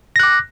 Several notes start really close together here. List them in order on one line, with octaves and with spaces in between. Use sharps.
A#6 F#6 D6